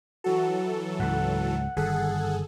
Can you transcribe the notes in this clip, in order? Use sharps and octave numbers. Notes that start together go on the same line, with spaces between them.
E3 F#3 F#4 A4
C#2 G#2 F#5
G1 D#3 G3 G#4 A4 F#5